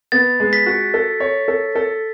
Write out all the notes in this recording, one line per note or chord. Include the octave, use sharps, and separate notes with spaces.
B3 A6
G#3
B6
F#4
A4
C#5
A4
A4